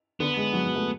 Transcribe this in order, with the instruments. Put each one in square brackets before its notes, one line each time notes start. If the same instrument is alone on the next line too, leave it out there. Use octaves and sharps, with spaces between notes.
[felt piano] D3 [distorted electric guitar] B3
[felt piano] G#3
F#3
F#3
A3